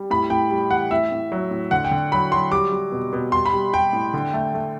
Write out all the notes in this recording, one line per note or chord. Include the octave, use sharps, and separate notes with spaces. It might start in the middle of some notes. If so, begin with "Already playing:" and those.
Already playing: G3
A2 B5
A2 G5
G3
E3 F#5
A2 E5
A2
F#3
A2
D3 F#5
G5
D3
F#3 B5
F#3 C6
G3 D6
G3
B2
B2
G3 C6
B5
G3
G3 G5
A2
D3
A3
A3